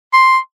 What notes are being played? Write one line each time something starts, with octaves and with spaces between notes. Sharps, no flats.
C6